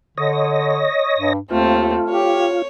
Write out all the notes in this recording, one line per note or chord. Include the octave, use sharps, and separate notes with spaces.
D3 C#5 D#5 A#6
G2
D#2 A3 C4 F4
G4 C#5